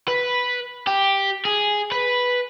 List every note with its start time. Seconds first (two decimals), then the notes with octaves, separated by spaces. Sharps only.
0.08 B4
0.87 G4
1.45 G#4
1.92 B4